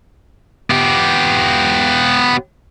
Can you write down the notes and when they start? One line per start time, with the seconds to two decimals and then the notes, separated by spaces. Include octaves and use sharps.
0.70 B3 G4